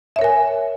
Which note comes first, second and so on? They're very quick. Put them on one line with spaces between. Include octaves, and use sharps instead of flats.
E5 C#5 A#4 G#5